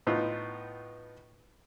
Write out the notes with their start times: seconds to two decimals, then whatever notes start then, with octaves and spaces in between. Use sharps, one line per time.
0.07 A2 B3 D#4 F4